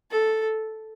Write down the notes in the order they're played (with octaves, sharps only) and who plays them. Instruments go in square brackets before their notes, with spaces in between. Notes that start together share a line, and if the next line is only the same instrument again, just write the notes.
[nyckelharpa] A4